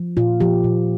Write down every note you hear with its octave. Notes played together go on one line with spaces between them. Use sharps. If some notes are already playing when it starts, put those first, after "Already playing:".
Already playing: F3
A#2 F4
F3 G4
A#2